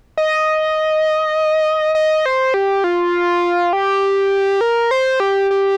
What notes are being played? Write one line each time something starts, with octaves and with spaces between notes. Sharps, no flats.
D#5
D#5
C5
G4
F4
G4
A#4
C5
G4
G4